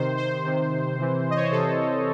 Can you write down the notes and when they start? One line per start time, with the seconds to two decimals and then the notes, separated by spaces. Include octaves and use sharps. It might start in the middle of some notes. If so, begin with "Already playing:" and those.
Already playing: C3 D#3 C5
0.17 C5
0.44 C3 D#3
0.97 C3 E3
1.30 D#5
1.36 C#5
1.43 C5
1.51 C3 E3 A4